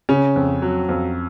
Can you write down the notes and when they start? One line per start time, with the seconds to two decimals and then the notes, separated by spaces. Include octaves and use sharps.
0.09 C#3 C#4
0.36 F2
0.62 F#3
0.89 F2